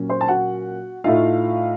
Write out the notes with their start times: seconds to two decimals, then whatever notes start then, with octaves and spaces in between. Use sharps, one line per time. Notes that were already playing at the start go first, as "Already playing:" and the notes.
Already playing: A#2 F#3 A#3 C#4
0.09 C5 C6
0.21 A5
0.28 F#4 F#5
1.04 A2 A3 D#4 F4 F5